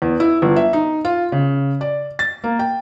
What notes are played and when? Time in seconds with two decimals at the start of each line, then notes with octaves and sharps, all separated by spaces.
0.02 E2
0.20 E4
0.42 G1
0.56 E5
0.73 D#4
1.05 F4
1.32 C#3
1.81 D5
2.19 A6
2.44 A#3
2.59 G5